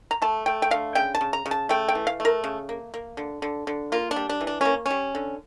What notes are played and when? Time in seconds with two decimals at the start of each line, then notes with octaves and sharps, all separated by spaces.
0.11 A#5
0.22 A3 A5
0.46 A3 G5
0.62 G5
0.71 D3 F5
0.95 C#3 G5
1.15 A5
1.21 C#3
1.33 A#5
1.46 C#3
1.51 A5
1.69 A3 G5
1.89 G5
1.95 E3
2.07 F5
2.20 A3 A#4
2.44 C#3
2.69 A#3
2.94 A#3
3.17 D3
3.42 D3
3.67 D3
3.92 A#3 F4
4.11 D4
4.16 G3
4.29 D4
4.41 E3
4.47 D4
4.61 A#3 C#4
4.86 G3 C#4
5.15 D3